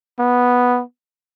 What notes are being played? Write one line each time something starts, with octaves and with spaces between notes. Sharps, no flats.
B3